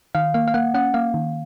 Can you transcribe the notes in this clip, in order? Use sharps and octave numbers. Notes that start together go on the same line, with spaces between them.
D#3 F5
A#3 F5
F5
A#3 F#5
C#4 F#5
A#3 F5
D#3